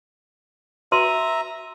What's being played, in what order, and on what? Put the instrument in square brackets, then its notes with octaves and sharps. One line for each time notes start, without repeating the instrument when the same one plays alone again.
[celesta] F#4 D#7 [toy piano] B4 C6 [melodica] E5 A#5